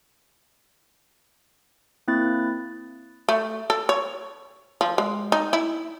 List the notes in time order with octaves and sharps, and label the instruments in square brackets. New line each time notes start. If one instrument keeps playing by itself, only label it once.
[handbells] A#3 C4 E4 F#6 A6
[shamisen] A3
A4
C#5
F3
G#3
D#4
E4